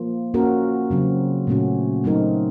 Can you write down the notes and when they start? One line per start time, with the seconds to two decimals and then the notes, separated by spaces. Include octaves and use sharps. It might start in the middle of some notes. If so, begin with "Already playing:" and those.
Already playing: F3 A#3 F4
0.34 A#3 C#4 F#4 A#4
0.90 C#3 F#3 C4
1.47 A#2 A3 C#4 F#4
2.04 F#3 A3 C4 D#4 A#4